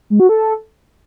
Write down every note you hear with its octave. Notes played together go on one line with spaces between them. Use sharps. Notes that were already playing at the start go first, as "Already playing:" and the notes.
G#3
F#4
A4